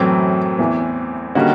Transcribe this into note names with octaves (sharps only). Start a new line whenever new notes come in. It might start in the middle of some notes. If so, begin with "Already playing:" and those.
Already playing: F#2 A2 E3 F#3 A3 C4
E2 E3
D3 D#3 G3 A#3 C#4 F#4